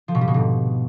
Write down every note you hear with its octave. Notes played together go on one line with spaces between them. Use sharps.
F3
B2
G3
B2
G#2